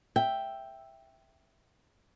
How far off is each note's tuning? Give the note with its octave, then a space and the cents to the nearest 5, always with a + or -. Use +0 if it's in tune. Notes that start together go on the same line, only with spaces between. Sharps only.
E5 +0 G5 +5